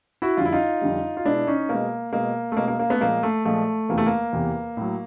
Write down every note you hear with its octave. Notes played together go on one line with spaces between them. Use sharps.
E4 F#4
F2 D3 G3 F4
E4
D#4 F4
F2 D3 G3
F4
B2 G#3 D4 E4
C#4 D#4
B2 G#3 A#3
B2 G#3 A#3
A3
B2 G#3 A#3
A#3
A#3
A3 B3
A#2 F3 G#3 A#3
A3
A#2 F3 G#3 A3
E2 C3 E3 A#3
A3
A#3
E2 C3 E3
A2 F#3